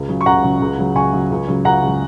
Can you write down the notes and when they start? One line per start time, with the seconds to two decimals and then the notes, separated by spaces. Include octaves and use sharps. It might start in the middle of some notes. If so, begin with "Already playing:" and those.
Already playing: C#2
0.08 C#3 F#3
0.21 C#6
0.26 C#2 F#5 A#5
0.43 C#3 F#3
0.60 C#2
0.78 C#3 F#3
0.95 C#2 G#5 C#6
1.13 C#3 F#3
1.30 C#2
1.48 C#3 F#3
1.65 C#2 F#5 A#5
1.82 C#3 F#3